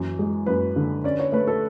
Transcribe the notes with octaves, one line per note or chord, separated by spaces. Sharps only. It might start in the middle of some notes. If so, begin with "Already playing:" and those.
Already playing: F#2 E3
G#3
F#2 B4
D3
C#4 D5
C#5
A3 B4
A4